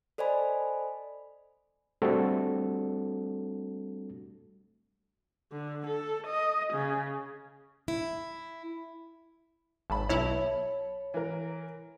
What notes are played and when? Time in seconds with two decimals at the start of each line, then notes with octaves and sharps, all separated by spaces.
0.18 A4 C5 D5 D#5 G#5 B5
2.02 G3 A3 C4 D4 F#4 A4
5.53 D3
5.88 A4
6.28 D#5
6.74 C#3
7.88 E4
9.90 G#1 A5 B5
10.09 B1 E4 C#5
11.14 E3 A#4